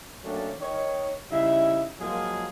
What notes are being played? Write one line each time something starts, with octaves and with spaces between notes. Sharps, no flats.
D#3 F#3 A3 A#3 C#4 D4
D#3 C#5
C#3 G3 D#4 E4 E5
F3 F#3 G#3 A#3 F4 G#4